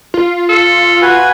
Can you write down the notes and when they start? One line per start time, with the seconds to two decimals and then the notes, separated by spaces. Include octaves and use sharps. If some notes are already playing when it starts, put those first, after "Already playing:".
0.14 F4
0.49 A4
1.02 F#4 B4 G#5